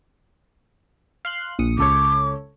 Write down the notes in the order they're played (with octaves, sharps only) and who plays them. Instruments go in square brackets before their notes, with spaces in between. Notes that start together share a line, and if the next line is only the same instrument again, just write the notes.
[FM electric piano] F5 C6 F#6
A#1 D#6 C#7
[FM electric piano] C#2 A4 C#5 [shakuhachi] D6